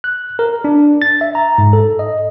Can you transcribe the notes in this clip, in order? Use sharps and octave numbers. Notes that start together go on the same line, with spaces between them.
F#6
A#4
D4
A6
E5
A#5
G#2
A4
D#5